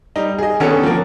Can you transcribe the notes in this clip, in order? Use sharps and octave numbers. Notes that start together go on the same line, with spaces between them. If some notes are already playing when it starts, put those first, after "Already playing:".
G3 D#4
G#4 D#5
D3 D#3 B3 C#4 A4
F3 A#3